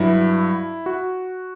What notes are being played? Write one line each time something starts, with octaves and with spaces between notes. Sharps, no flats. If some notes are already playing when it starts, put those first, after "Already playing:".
Already playing: G2 F#3 E4
F#4